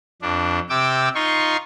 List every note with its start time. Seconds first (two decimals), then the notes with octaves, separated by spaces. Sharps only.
0.22 F2 D4
0.70 C3 G5 D6 E6
1.15 D#4 F4 C6 C#6